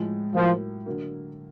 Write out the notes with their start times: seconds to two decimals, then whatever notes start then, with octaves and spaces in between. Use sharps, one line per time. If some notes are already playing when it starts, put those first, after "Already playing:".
Already playing: A2 F3 G#3
0.35 A2 F3 F#3 A#3
0.86 D3 F#3 A#3